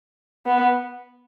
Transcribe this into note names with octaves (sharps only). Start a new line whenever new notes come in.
B3